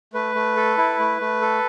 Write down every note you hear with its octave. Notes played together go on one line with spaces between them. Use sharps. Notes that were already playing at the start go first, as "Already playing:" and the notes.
A3 B4
A3
A4
E4
A3
A3
A4